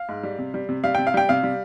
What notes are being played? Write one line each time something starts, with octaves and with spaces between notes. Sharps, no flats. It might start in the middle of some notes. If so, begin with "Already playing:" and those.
Already playing: F5
G#2
G3
C3
G3
C3
G3 F5
C3 G5
F5
G3 G5
C3 F5
G3